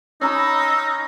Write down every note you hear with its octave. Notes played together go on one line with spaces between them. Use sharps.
C#4 D#4 A#5 B5 E6